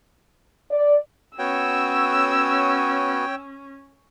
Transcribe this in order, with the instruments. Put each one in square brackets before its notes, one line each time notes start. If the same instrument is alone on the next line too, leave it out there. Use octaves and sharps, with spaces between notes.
[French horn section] D5
[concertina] B3 F#4 [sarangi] C#4 [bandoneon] C#5 G5 [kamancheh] E6